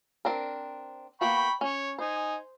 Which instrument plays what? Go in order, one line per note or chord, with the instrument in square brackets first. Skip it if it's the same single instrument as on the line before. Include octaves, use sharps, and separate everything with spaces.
[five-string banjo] C4 D4 A#4
[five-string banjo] A#3 B3 F#4 [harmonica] G5 B5 C#6
[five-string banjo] C#4 [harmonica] C#5
[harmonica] D#4 G#5 [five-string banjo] C5